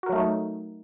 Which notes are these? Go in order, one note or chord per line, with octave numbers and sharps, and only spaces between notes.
F#3 A3 D#4 F#4 A#4